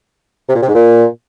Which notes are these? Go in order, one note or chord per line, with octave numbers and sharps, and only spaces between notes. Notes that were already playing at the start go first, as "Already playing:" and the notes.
C3
A#2
C3
G#2
A#2